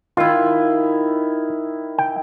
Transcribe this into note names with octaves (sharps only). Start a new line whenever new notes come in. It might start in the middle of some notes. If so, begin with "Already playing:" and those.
D#3 E4 F4
G5